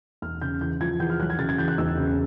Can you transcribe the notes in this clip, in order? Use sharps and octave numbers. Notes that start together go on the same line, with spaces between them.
E1 F6
C#3 G6
E2 G6
F3 G#6
E2 G6
F6
F#3 F#6
G#6
C#3 A6
G#6
E2 G6
F#6
E1 E6
C#3